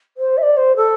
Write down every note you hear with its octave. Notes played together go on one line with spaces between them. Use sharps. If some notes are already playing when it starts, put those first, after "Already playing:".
C5
E5
D5
C5
A4